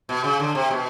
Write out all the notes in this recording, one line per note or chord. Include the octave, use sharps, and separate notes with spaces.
B2
C#3
D3
C3
B2